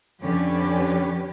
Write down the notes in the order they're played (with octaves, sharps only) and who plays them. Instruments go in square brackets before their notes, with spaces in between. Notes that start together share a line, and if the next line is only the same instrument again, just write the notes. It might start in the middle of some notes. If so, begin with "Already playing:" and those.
[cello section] F2 D3 C#4 G4 B4